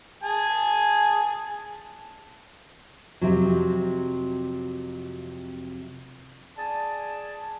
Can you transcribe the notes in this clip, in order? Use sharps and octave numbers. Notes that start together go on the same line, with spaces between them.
G#4 G#5 A5
F2 C3 F#3
G#4 D5 G#5 A5